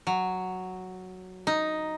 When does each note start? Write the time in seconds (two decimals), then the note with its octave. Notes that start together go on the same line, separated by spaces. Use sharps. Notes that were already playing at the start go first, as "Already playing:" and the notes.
0.07 F#3
1.47 D#4